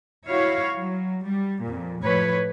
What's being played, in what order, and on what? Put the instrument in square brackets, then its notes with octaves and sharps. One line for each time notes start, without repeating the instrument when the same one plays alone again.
[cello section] E4 F#4 C#5 F5
F#3
G3
F2 A#2
A2 F3 B4 C#5